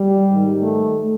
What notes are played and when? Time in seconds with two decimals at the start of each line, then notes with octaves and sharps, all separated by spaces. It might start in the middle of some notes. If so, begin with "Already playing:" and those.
Already playing: G3
0.29 G#2 D#3
0.61 A3